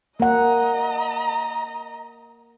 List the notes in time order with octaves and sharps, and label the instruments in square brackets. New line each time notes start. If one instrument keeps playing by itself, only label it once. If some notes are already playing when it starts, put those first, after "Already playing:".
[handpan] A#3 F#5 [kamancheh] D#5 A#5